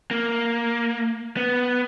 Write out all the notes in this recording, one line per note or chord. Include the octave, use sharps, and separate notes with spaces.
A#3
B3